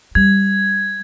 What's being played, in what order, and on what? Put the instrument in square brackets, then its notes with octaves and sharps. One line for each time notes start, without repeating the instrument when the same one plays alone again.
[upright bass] G3 [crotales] G#6